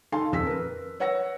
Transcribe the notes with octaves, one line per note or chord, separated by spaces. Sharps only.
D#4 A4 F5 G#5 A5 C6
D#1 F2 E6 B6
A#4 B4
B4 C#5 F#5 E6 A#6